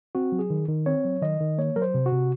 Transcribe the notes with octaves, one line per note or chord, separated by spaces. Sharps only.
C4 F#4
F#3
G#4
D#3
D#3
C4 C#5
F#3
D#3 D#5
D#3
A#3 C#5
F#3 A#4
C5
C3
F#4
C3